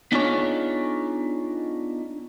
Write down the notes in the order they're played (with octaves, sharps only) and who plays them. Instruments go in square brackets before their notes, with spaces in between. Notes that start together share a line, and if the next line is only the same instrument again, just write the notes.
[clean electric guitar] B3 D4 D#4 F4 G#4 C#5